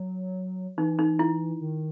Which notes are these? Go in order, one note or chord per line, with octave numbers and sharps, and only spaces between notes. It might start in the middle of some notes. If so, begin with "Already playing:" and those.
Already playing: F#3
E3 D#4
D#4
E4
D#3